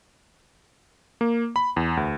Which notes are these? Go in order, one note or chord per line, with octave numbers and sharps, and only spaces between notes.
A#3
B5
E2
D2